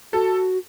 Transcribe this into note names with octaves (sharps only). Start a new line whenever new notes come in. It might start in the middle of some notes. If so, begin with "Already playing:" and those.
F#4 A4